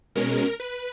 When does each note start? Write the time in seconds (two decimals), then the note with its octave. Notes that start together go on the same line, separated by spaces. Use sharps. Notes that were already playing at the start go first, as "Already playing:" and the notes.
0.15 B2 G#3 C#4 A#4
0.60 B4